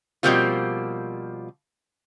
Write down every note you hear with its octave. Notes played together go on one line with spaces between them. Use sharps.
B2 F3 G3 A#3 C4 F4